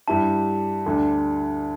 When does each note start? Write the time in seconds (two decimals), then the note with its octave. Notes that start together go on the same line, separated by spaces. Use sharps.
0.08 G2 G3 E4 A5
0.86 D2 D3 G3 D4